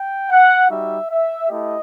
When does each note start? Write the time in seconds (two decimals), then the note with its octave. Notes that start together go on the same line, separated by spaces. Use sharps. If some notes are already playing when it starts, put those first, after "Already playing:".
Already playing: G5
0.30 F#5
0.69 G3 D#4 F#4 E5
1.10 E5
1.49 A3 E4 G4 D#5